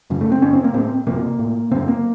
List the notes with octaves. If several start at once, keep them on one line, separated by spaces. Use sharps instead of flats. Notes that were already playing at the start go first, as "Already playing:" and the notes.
F#2 C#3
A3
C4
F#2 C#3 C#4
C4
A#3
A2 C4
F2 C3 A#3
A2
F#2 C#3 C4
A#3